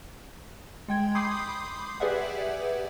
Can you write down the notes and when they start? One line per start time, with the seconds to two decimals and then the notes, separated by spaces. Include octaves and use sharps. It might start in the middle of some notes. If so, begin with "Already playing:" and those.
0.88 G#3 G5 G#6
1.15 B5 C6 D6 D#6 G6 C7
2.00 G4 G#4 B4 D5 E5 F#5